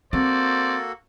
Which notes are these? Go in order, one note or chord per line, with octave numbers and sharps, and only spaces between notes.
A#3 C4 F#4 A4 C5 D5